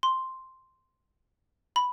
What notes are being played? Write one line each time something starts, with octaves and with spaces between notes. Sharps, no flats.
C6
B5